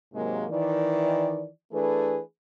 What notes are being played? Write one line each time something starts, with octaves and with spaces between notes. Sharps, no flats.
G#2 C3 F#3 G#3 A#3
D#3 E3 D5
E3 A3 D4 G#4 B4